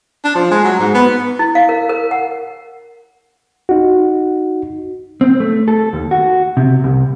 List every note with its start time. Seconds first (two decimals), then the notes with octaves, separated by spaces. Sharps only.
0.24 D4
0.35 F3
0.51 G#3
0.64 F#3
0.80 G#2
0.94 B3
1.39 E4
1.55 F5
1.69 A#4
1.89 A#4
2.11 F#5
3.69 D#4 F#4
5.21 C4
5.40 A3
5.68 A4
5.93 D#2
6.11 F#4
6.57 C3
6.84 C2